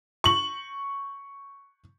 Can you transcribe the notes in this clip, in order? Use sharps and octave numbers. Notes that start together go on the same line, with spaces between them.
C#6 F#7